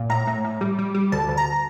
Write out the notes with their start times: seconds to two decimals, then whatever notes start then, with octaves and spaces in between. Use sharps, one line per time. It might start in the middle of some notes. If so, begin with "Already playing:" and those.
Already playing: A#2
0.10 A2 A#5
0.27 A2
0.45 A2
0.61 G3
0.79 G3
0.95 G3
1.12 D2 A5
1.29 D2
1.37 A#5